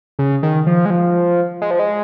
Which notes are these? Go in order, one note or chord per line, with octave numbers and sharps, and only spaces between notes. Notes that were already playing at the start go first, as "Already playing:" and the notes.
C#3
D#3
F3
G#3
F3
G#3
F3
G#3